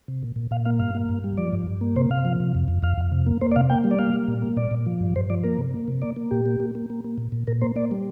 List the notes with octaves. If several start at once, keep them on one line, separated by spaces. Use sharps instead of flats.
C3
A#2
A#2
A#2 F5
A#3 F5
G2 F5
A#3
G2
G3
F3 D5
G2
G2
A#3
C3 C5
C3 F5
F3
C3
F2
F2
F2 F5
F2
C3
A#3
A#3 C5
D5
C3 F5
A#3 G5
G3
D5
A#3 F5
G3
A#2
A#3
A#2 D5
A#2
F3
G2
G2 C5
F3 D5
A#3 A#4
C3
A#3
C3
A#3 D5
A#3
A#2 G4
A#3
A#3
A#3
A#3
A#3
A#2
A#2
A#2 A#4
A#3 C5
A#3 D5
G3